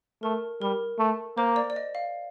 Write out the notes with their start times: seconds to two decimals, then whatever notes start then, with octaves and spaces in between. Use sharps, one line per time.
0.23 A3 A#4
0.61 G3 A#4
0.99 A3
1.37 A#3 C5
1.56 D5
1.70 D5
1.76 D#5
1.95 F5